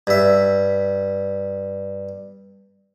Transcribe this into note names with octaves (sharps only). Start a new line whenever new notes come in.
G2 E5